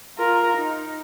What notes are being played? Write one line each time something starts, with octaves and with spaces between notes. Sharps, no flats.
F4 A#4
D#4